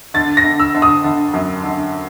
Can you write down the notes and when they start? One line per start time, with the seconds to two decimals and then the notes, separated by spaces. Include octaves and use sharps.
0.14 D3 A6
0.37 A#6
0.44 D3
0.60 E6
0.75 D3
0.82 D#6
1.04 D3
1.34 F#2
1.64 D3